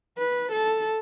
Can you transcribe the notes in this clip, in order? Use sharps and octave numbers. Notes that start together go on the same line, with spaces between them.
B4
A4